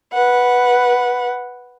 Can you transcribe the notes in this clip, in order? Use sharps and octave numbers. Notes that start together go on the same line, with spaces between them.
B4 F#5